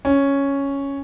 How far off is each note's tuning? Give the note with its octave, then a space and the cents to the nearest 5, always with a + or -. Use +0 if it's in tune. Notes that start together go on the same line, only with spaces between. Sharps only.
C#4 +0